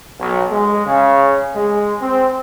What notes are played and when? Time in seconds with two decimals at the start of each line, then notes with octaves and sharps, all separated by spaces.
0.20 B1
0.51 G#3
0.86 C#3
1.55 G#3
2.02 C4